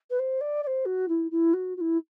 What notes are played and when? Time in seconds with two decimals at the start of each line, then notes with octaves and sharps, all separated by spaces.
0.10 B4
0.19 C5
0.41 D5
0.63 D5
0.67 C5
0.85 F#4
1.08 E4
1.31 E4
1.53 F#4
1.76 F#4
1.80 E4